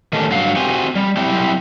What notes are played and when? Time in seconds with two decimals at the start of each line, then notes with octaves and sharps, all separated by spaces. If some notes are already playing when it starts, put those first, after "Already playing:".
0.13 D#3 A3 C#4 D4 G4
0.31 G2 F#3 F5
0.56 C4 F#4 G4 G#5
0.95 G3
1.17 F#3 C4 E4 G4